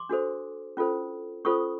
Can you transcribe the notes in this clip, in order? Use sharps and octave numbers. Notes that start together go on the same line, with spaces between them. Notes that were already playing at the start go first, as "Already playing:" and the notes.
Already playing: C6 D6
D4 F#4 A4 C5
C#4 F4 A4 C5
C#4 F4 A4 C5 C#6 D#6